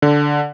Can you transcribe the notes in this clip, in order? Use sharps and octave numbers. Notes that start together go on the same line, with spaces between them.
D3